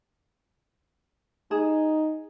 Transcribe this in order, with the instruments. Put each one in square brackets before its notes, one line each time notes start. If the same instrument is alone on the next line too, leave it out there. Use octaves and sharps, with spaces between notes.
[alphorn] D#4 [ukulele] G#4